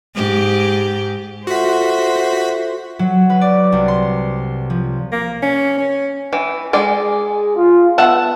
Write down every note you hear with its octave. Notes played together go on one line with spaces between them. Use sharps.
G#2 G4
F4 F#4 A4 C5 E5 B6
F#3
B4
D5
C2
C6
F3
A#3
C#4
C#4
E3
G#3 G#4 D5
F4
B3 E5 F#5 A5